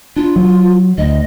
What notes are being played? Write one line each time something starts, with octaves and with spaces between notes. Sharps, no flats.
D4 F4
F#3
D2 D#5